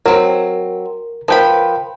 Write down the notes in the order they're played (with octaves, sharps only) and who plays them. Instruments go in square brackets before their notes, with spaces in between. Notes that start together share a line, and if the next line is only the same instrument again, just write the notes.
[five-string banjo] F#3 C4 [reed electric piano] A#4
[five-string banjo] F3 B4 B5 [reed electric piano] A#4 G5